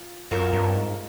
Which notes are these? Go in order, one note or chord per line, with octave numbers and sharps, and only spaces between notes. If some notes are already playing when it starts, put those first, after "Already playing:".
Already playing: F4
F#2 C4 F4 A#4 C#5
G2
G#2